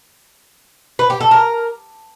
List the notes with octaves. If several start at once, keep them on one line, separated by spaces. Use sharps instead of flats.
B4
G4
A4
A#4